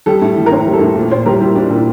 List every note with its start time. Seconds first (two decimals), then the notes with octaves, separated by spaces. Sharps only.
0.06 G3 A4
0.22 A2
0.37 E3
0.46 A#4
0.52 A2 C5
0.67 G3
0.74 A4
0.81 A2
0.95 A#2
1.11 A#2 C5
1.26 G3 A#4
1.41 G3 E4
1.56 A#2 D4
1.70 A#2 E4